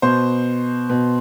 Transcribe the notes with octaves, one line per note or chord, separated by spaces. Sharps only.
B2 C5
B2